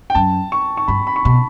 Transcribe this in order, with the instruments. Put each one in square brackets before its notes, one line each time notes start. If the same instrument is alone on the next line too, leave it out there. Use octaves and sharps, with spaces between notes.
[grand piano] G5
[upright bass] F#2 [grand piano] A5
[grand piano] C#6
C#6
[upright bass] G2 [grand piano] B5
[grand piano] B5
C#6
[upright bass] B2 [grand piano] B5